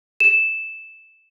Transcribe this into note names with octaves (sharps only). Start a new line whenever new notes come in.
E7